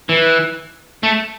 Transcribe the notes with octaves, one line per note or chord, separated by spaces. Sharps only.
E3
A3